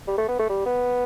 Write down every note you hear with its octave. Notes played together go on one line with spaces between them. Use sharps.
G3
A3
B3
A3
G3
B3